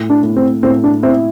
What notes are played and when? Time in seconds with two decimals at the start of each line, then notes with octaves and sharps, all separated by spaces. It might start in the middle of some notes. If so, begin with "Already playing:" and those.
Already playing: A2
0.10 D4
0.23 A2
0.36 C4
0.63 A2 C4
0.84 D4
1.03 C4 E4